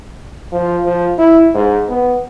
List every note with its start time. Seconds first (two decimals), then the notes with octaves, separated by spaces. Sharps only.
0.52 F3
0.85 F3
1.18 E4
1.54 G#2
1.89 B3